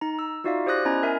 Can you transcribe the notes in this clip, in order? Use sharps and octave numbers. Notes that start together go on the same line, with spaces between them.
D#4 A#5
E6
D#4 F4 F#4 D5 E5 F5
G4 C5 D5 D#6 F#6 A#6
B3 C#4 E4 D#5 A#5 G#6
A#4 E5 G#5